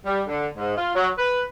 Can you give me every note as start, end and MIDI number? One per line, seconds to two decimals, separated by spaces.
0.05 0.22 55
0.28 0.46 50
0.56 0.76 44
0.76 0.93 65
0.94 1.09 54
1.18 1.42 71